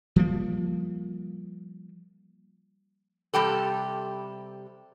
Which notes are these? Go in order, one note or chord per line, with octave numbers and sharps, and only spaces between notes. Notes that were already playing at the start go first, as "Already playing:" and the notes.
F3 G3 A#3
C3 G3 G4 A4